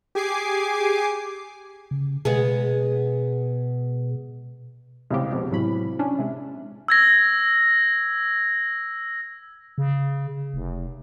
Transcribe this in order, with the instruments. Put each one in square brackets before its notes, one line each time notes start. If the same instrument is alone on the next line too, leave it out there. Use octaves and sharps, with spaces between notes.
[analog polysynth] G4 G#4 G#5 D6 C7
[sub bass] C#3
[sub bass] B2 [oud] G#3 B3 G#4
[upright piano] C2 C#3 C4 [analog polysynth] G#3 G4
[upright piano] F2 B2
[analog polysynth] A2 F#3 B5 [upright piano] C3 E3
[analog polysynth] C#4 D4
[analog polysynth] C3 G#3 [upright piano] E5
[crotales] E6 G#6 A#6
[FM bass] C#3
F1